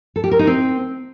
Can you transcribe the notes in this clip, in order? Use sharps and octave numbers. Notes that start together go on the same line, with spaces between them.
A4
G4
A#4
D#4
C4